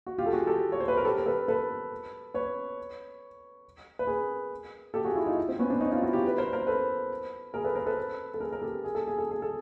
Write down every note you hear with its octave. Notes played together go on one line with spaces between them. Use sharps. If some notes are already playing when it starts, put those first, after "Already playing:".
F#4
F4 G4
A4
F#4 G#4
G4 A4
C#5
C5
B4
A#4
G4 A4
A#4
A4 B4
A4 B4
B4 C#5
B4
G#4 A#4
G4 A4
F#4 G#4
F4
E4 F#4
D#4 F4
C4
B3 C#4
C4 D4
C#4 D#4
D#4 F4
E4 F#4
F4 G4
B4
A#4 C5
A#4 C5
A4 B4
G#4 A#4
A4 B4
A#4 C5
A4 B4
A4
G#4 A#4
A#4
G4 A4
G#4
A4
G#4
A4
G#4
A4